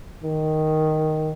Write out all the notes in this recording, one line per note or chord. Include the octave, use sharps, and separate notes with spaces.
D#3